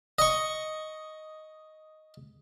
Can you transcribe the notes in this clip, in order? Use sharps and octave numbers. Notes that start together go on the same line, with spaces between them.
D#5 C#6